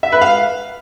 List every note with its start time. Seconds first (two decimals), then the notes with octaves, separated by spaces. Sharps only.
0.03 E5
0.12 B4
0.21 F5